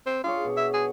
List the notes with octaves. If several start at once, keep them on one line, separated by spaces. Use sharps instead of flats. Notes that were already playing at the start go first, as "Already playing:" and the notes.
C4
D4 F4 G#4 C#5
B2
E5
G#4